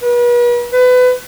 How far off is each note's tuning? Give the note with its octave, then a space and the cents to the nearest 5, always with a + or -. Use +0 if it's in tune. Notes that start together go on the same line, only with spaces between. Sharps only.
B4 -40
B4 +25